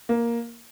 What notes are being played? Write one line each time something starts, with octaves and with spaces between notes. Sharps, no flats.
A#3